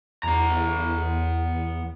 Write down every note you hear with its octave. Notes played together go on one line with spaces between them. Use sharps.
E2 B3 A#5